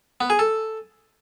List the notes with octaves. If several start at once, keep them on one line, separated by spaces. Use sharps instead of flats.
B3
G#4
A4